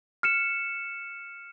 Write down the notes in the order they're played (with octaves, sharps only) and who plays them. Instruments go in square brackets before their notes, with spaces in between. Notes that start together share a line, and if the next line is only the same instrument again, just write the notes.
[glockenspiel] F6 C#7 E7